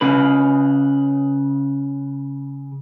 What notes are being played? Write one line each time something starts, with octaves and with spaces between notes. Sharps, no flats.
C#3 B4